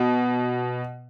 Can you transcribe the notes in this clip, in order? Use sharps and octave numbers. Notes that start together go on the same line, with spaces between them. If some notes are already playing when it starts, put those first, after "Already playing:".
Already playing: B2